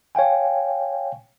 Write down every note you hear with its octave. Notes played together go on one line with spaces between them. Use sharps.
C#5 F5 G5 G#5